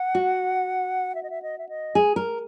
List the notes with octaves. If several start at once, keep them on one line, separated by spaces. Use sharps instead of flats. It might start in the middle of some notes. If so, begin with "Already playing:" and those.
Already playing: F#5
F#4
E5
D#5
E5
D#5
E5
D#5
G#4
A#4